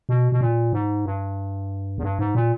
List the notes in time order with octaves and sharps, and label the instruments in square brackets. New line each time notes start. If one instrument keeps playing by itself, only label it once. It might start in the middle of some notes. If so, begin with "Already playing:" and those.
[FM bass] B2
B2
A#2
G#2
G2
E2
G2
G#2
A#2